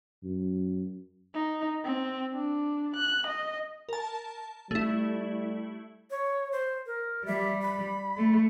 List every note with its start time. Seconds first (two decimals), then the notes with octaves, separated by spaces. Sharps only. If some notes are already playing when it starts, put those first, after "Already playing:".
0.24 F#2
1.34 D#4
1.84 C4
2.34 D4
2.96 F#6
3.27 D#5
3.89 A#4 A5
4.71 G3 A3 E4
6.11 C#5
6.52 C5
6.86 A#4
7.26 G3 E5
7.62 B5
8.17 A3